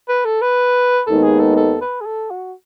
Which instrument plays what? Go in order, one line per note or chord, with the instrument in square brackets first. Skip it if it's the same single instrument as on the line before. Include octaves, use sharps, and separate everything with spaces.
[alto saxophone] B4
A4
B4
[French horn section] D#2 D#3 G#3 B3 D#4 [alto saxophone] A4
[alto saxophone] G#4
A4
A4
B4
G#4
A4
F#4